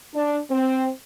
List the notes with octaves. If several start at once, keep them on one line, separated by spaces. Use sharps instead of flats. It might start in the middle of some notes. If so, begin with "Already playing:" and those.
D4
C4